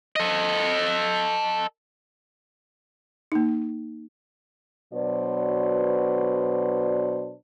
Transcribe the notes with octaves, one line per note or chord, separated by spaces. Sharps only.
A4 D#5
A#3 D#4
B2 F#3 D4 B4 C5 D5